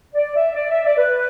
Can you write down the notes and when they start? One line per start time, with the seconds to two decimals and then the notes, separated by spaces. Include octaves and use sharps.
0.14 D5
0.36 E5
0.56 D5
0.70 E5
0.85 D5
0.98 B4